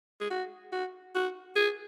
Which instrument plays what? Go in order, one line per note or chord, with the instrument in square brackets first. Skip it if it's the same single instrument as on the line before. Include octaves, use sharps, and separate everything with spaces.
[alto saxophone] G#4
F#4
F#4
F#4
G#4